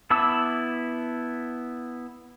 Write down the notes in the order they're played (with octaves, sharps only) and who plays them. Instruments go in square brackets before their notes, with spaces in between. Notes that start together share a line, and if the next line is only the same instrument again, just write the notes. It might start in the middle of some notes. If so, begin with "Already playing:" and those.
[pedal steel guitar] B3 E4 A5 D6 E6